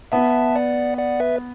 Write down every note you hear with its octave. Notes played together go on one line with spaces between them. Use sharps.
B3 E5 A5
D5 F#5
D5 F#5
B4 E5